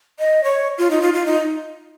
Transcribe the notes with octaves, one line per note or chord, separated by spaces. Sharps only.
D#5
C#5
F4
D#4
F4
F4
D#4